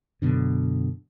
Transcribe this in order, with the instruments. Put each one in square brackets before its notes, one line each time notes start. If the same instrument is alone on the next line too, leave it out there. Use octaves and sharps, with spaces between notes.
[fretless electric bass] F#2 B2 D3